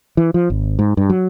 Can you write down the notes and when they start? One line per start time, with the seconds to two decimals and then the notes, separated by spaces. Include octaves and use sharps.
0.17 E3
0.34 F3
0.50 G#1
0.79 G#2
0.97 G2
1.10 F#3